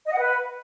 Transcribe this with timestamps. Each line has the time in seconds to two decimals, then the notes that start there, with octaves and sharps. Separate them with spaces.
0.07 D#5
0.12 F#5
0.18 B4